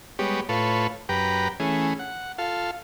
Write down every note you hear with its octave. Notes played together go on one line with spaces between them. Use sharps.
G3 G#3 B3 G4 C#5
A2 F4 A4 B4 C#5
F#2 G4 B4 G5 A#5
E3 A3 C#4 G#4
F#5
F4 A4 F5